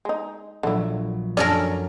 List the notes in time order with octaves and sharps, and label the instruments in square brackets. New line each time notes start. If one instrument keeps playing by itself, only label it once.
[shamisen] G#3 D#4
[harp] A#1 A#2 F#3 [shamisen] D3 E4
[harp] F#2 A3 C#6 [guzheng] C#4 A4 A#4 [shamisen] D4 D5